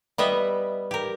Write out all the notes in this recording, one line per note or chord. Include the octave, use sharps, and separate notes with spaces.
G3 B3 D#5 E5
G4 A#4